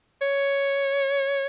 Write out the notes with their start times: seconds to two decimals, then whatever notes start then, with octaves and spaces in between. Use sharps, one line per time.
0.21 C#5